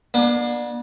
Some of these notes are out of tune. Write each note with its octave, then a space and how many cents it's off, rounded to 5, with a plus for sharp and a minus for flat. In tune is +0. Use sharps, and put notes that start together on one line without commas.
B3 -40 D4 +25